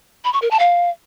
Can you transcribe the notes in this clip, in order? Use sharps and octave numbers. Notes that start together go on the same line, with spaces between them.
B5
C#6
A#4
A5
F5